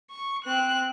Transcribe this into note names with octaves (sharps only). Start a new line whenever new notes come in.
C#6
C4 F#6